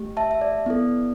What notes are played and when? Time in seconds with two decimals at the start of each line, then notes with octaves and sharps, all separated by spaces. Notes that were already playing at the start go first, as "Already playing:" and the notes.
Already playing: A3 G4
0.17 E5 A5
0.31 E5
0.41 D5
0.66 B3 E4 A4